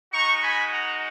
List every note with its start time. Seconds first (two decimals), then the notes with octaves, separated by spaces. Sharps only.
0.13 G#3 D#4 F#4 A#5 C#6
0.43 G#5 B5
0.73 F#5 A#5